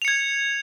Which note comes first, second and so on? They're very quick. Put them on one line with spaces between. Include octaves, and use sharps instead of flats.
F7 C#7 G#6